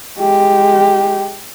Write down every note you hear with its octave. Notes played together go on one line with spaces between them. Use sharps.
G#3 G4